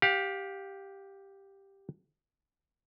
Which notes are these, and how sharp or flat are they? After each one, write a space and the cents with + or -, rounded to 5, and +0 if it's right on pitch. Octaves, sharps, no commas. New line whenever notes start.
G4 +0 F5 +30